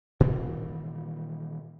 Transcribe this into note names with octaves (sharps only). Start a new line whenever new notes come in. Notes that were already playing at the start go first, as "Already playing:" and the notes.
A#2 D#3 E3 G3